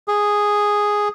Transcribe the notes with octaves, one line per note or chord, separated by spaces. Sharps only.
G#4